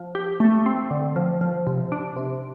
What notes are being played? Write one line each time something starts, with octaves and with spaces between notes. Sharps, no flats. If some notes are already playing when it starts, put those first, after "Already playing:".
Already playing: F3
G4
A3
C4
D3
F3
F3
C3
D4
C3